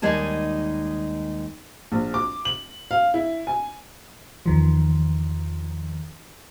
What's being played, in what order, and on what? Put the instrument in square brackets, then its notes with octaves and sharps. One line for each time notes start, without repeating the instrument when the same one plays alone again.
[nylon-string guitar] D#2 G3 G#3 D#4 G#4 A5
[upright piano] A#1
D6
F#7
F5
E4
G#5
[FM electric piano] E2 D#3 F3